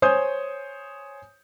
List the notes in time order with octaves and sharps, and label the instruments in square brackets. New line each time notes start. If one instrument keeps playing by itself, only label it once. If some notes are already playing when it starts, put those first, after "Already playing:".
[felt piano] C5 C#5 G#5 D#6 G6